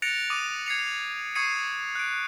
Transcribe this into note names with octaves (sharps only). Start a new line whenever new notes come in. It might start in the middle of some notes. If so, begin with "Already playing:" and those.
F#6 A6 A#6 C#7 D7 F7
D6 D#6 D#7
G#6 C7 C#7 F7
C#6 D#6 G#6 C7 C#7 D#7
F#6 D7